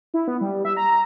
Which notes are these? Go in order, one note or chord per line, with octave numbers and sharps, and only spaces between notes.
E4
B3
G3
E5
A#5
A#5